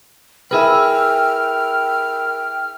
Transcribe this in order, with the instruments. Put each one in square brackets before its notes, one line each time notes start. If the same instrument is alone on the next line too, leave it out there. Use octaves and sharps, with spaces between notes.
[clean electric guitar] E4 G#4 B4 [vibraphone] A#4 E6 [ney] G5 [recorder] F6